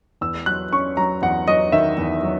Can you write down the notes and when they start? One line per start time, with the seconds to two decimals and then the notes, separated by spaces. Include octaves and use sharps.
0.21 E2 E6
0.46 F#3 F#6
0.72 C#4 C#6
0.97 F#3 A#5
1.22 E2 F#5
1.48 F#3 D#5
1.72 D#3 E5
1.98 E2
2.23 F#3